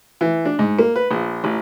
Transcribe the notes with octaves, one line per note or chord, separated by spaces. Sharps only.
E3
D4
G#2
A#3
B4
A#1
A1